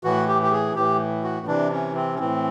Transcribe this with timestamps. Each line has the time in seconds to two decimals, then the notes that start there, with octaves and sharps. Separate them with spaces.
0.04 A2 E3 F#4
0.28 G4
0.42 G4
0.52 G#4
0.75 A2 E3 G4
1.23 F#4
1.47 C3 E3 D4
1.71 C#4
1.95 C4
2.14 C#4
2.19 A2 E3 C4